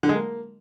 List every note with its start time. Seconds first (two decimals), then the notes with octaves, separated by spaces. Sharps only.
0.03 D3
0.09 G#3
0.15 A#3